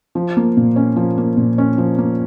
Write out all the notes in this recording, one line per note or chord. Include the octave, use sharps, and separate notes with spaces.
F3
A#3
A#2
C#4
F3
A#3
A#2
C#4
F3
A#3